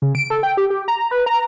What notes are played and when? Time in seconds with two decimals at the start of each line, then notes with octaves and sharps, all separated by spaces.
0.02 C#3
0.15 D7
0.30 A4
0.43 G5
0.57 G4
0.70 G4
0.88 A#5
1.11 B4
1.26 A#5